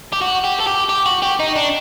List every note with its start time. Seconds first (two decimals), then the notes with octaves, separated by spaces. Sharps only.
0.13 G4
0.22 F#4
0.44 G4
0.60 A4
0.66 G4
0.89 G4
1.06 F#4
1.23 G4
1.40 D#4
1.56 D4